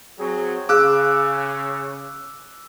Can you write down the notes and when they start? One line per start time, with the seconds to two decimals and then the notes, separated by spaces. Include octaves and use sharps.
0.19 F#3 C4 G#4
0.69 C#3 G#4 F5 D6 E6 F#6